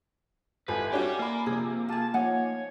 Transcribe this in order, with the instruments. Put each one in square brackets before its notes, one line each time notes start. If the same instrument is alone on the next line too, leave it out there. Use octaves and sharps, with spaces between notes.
[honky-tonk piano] G#1 [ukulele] E4 F4 A4 [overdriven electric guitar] B4 [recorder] G#5
[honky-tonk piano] C#4 D4 F#4 [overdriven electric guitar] G4 D5
[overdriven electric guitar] A#3 [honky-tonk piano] D5 B5
[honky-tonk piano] C3 F3 [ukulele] G#4
[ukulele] F4 G#4 [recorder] A5
[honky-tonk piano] F3 [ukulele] D#4 F#5 G#5 [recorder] C#5